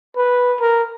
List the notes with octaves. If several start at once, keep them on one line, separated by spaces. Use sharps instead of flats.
B4
A#4